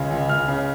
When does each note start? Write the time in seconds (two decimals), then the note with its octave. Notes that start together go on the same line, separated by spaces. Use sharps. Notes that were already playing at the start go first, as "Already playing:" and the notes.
Already playing: C#2 C#3
0.11 C#2
0.29 C#2 F6
0.48 C#3